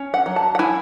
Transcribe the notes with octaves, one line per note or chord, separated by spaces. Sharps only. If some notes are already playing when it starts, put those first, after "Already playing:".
Already playing: C#4
F#5
F#3
A5
F#5
E4 G#5